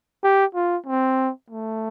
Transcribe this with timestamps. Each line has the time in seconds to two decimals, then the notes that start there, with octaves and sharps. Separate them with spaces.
0.23 G4
0.55 F4
0.86 C4
1.50 A3